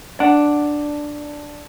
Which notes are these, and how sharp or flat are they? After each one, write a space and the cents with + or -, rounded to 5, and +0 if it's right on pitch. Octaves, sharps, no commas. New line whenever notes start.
D4 +0 F#5 +0